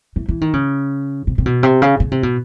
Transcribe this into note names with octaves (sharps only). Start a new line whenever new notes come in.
E3
E3
D#3
C#3
C3
C3
B2
C3
C#3
C#3
C3
B2